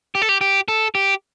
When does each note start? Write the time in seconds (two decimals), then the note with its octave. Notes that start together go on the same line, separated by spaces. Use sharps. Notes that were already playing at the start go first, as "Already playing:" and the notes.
0.15 G4
0.22 A4
0.29 G4
0.41 G4
0.68 A4
0.95 G4